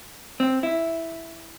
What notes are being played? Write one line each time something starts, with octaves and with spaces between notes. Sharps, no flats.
C4
E4